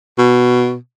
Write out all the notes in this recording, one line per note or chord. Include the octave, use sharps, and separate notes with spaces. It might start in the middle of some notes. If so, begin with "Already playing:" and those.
B2